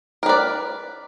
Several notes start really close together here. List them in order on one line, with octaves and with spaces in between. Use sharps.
A#4 B4 D5